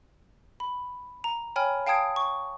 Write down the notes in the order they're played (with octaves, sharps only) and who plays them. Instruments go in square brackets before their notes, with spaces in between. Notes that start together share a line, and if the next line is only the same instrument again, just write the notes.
[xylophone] B5
A#5
C#5 G5 G#5 B5 F6
F5 G5 A5 D#6 G#6 D7
C#6